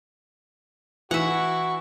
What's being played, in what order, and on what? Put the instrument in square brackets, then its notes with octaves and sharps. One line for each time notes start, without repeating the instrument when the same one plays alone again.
[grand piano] E3 [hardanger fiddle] E4 C#6 [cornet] F#4 [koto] E5 F#5